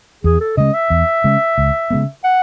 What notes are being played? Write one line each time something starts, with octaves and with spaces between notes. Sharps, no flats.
E2 G#4
A4
C#3 G#3 C#4 D#5
E5
E2
C#3 G#3 C#4
C#2
C#3 G#3 B3
F#5